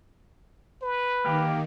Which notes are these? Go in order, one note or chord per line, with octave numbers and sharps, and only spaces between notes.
B4
D#3 A#3 G4